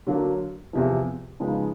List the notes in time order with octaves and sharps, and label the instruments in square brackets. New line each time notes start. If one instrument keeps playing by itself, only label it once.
[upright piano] D3 F#3 A#3 D4
E2 C3 F3
C#3 F3 G#3 B3 D#4